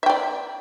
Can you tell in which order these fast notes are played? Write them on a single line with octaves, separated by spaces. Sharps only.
E5 G5 D5